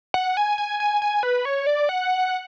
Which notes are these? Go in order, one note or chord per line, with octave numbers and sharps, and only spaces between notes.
F#5
G#5
G#5
G#5
G#5
B4
C#5
D5
F#5